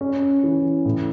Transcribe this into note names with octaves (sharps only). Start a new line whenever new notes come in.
C#4
E3
A2